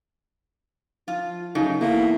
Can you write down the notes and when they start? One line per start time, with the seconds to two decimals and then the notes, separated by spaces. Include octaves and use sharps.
1.08 F3 F4
1.55 F#2 C#3 A3 D#4
1.81 E2 A3 A#3